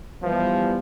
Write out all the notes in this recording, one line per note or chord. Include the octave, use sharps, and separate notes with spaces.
E3 F3 G3 B3